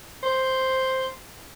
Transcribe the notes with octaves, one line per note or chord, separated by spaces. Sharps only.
C5